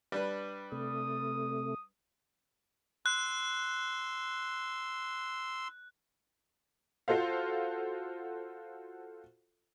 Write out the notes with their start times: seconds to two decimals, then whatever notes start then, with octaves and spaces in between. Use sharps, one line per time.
0.12 G3 D4 B4
0.72 C3 A3 D#6
3.06 C6 E6 F#6
7.08 F4 F#4 A4 C5 F5